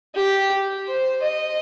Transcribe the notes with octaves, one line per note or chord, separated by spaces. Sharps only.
G4
C5
D#5